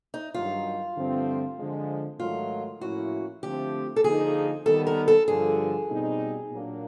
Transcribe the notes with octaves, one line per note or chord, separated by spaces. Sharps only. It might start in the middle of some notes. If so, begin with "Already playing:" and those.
D#4
G2 D#3 F#3 F4
G2 D3 F3 A3 C4
D3 F3 G#3
G#2 D#3 F#3 A3 F4
A2 F3 A#3 C#4 E4 F#4
D3 F3 A3 C4 G4
A4
D3 F3 A#3 D#4 G#4
D#3 G3 B3 A4
A#4
A4
G2 D3 F3 G#4
B2 G3 C4 D#4
A#2 F#3 A#3 D4